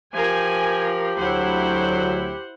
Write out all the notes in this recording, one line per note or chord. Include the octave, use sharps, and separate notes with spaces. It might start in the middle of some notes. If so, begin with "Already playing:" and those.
F3 G4 A#4 G#5
D2 F#3 E4 C5 F#5